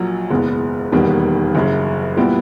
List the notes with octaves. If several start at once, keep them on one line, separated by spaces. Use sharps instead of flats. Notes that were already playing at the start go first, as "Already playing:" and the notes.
Already playing: A#1 A#2 F#3
F#1 E2 B2 G#3 B3
E1 D#2 D#3 G3 B3
F#1 F#2 C#3
A#2 G3 B3 E4 G4